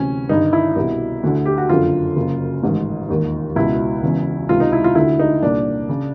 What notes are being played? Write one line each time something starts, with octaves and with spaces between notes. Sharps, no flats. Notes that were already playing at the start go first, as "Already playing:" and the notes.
Already playing: D2 C3 E3 C#4
G1 G2 D#3 D#4
E4
C2 B2
D2 D3
G4
F#4
F#1 F2 D3 F4
F#1 F#2 C#3
A1 G#2 D#3
E1 D#2 D#3
C#2 B2 E4
E1 E2 C#3
C#2 C3 D#3 F4
D#4
E4
F4
D2 D3 E4
D#4
C2 A#2 D4
C#3